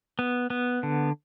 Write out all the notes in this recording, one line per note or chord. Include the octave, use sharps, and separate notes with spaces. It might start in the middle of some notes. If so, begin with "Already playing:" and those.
B3
B3
D3